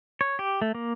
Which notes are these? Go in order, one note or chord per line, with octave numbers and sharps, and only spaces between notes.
C#5
G4
A3
A#3